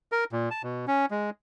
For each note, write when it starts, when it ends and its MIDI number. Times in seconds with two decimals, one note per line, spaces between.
0.12 0.24 70
0.32 0.49 46
0.51 0.62 81
0.63 0.85 47
0.88 1.06 61
1.11 1.30 56